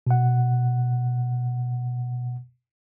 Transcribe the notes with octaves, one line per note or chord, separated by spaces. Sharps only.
B2 F#5